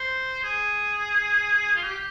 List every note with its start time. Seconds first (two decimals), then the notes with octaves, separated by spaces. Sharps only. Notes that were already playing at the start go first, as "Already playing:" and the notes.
Already playing: C5
0.44 G#4
1.75 F4
1.83 G4